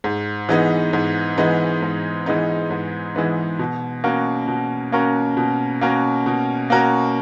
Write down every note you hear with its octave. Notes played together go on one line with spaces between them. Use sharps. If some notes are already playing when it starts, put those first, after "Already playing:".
G#2
E3 G#3 B3 D#4
G#2
E3 G#3 B3 D#4
G#2
E3 G#3 B3 D#4
G#2
E3 G#3 B3 D#4
B2
A#3 C#4 F#4 A#4
B2
A#3 C#4 F#4 A#4
B2
A#3 C#4 F#4 A#4
B2
A#3 C#4 F#4 A#4